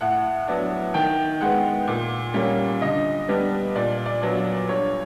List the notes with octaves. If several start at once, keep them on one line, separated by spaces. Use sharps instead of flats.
A2 F#5
F#3 B3 D4
D#3 G5
G#3 B3 F#5
A#2
G3 A#3 C#4
D3 D#5
G3 B3 D4
A#2 D5
D5
F#3 B3 D4
D5
G2 C#5